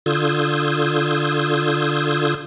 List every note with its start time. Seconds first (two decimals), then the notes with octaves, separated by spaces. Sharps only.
0.06 D3 F4 D#6 E6 G6 G#6